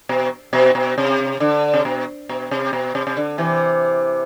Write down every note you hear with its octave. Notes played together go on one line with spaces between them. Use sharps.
B2
B2
B2
C3
D3
C3
B2
B2
C3
B2
C3
C3
D3
C3 E3